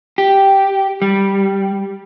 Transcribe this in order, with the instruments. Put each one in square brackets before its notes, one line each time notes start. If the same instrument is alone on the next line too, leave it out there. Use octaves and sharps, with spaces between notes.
[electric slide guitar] G4
G3